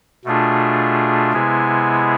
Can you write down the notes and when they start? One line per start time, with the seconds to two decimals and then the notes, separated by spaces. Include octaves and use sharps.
0.25 B2 A3 D4 F4 G#4
1.33 C3 G#3 B3 E4 G#4